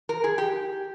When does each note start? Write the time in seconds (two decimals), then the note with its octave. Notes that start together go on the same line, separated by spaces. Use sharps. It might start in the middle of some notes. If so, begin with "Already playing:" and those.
0.09 A#4
0.24 G#4
0.38 G4